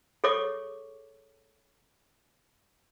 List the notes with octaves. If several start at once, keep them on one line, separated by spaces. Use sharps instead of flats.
G#4 A4 C#5 C#6 D6